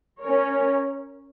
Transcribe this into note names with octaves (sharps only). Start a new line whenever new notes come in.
C#4 A#4 C#5